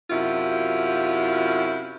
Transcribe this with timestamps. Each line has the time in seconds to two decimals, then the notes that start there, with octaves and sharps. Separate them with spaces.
0.10 F#2 C3 E4 F4